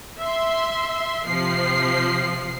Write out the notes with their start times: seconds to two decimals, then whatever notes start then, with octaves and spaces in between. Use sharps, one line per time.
0.20 E5 C6
1.27 C3 F3 C7